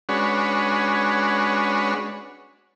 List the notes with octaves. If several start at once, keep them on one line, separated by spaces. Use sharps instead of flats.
G#3 C#4 D4 F#4 B4 C#5